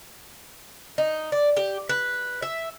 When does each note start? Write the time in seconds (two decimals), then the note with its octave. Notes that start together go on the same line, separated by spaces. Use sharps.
0.98 D#4
1.32 D5
1.57 G4
1.89 B4
2.42 E5